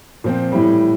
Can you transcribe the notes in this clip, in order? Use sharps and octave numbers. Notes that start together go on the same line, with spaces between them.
A#2 F3 C4
A2 E3 G3